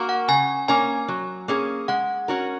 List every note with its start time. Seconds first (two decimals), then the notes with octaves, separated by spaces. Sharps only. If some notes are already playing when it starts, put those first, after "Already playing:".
Already playing: A#3 F#4 A#4
0.09 F#5
0.28 C#3 G#5
0.68 A#3 C#4 A#4 G#5
1.08 F#3
1.48 A#3 C#4 G#4
1.88 G#3 F#5
2.28 C#4 F#4 A#4